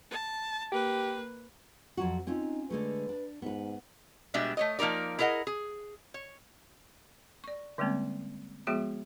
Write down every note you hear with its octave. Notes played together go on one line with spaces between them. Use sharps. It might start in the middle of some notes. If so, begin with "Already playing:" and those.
A5
A#3 G4 B4
F2 F#3 F#4
C4 C#4 D#4 F4
D3 G#3 A3 B4
D4
G#2 B3 B4
B2 G3 G#3 D4 E5
A3 C#5 D#5
F3 A#3 D#4 A#4 D5
E4 G#4 A#4 D#5 F#5
G#4
C#5
D5 C#6
D3 G3 G#3 A#3 C4 C#4
F3 G#3 B3 F#4 G#4 E5